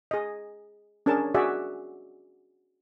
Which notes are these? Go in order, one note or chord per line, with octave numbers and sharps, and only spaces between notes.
G#4 D#5
C#4 D4 G#4 A#4 A5
F#4 G#4 D5 E5